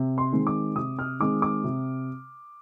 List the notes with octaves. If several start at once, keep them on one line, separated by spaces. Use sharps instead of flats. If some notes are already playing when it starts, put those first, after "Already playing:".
Already playing: C3
C6
D#3 G#3 C4
D6
C3 D#6
F6
D#3 G#3 C4 D6
D6
C3